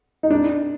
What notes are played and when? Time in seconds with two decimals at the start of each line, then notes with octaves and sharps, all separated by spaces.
0.23 D#4
0.31 D4